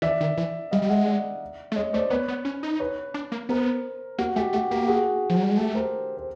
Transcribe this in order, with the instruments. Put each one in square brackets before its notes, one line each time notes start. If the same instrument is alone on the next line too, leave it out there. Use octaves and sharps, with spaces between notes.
[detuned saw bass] E3 [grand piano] D5 E5
[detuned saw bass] D#3
E3
[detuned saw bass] G3 [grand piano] D#5 F5
[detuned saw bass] G3
[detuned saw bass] G#3 [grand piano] E5 F#5
[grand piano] D5 E5
[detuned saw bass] A3
[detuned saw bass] G#3 [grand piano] C#5 D#5
[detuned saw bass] A3 [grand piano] C5 D5
[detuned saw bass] B3 [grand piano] B4 C#5
[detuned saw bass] B3
C#4
D#4
[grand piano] B4 C#5
[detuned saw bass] D4
A#3
[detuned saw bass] B3 [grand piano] A#4 C5
[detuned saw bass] A#3 [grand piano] F#4
[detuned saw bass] A3 [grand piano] G4
[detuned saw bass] A3 [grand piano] F#4
[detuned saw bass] A#3 [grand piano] G4
[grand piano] F#4 G#4
[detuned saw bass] F3
F#3
G3
G#3
[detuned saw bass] A3 [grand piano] G4 A4
[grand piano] A#4 C5
C5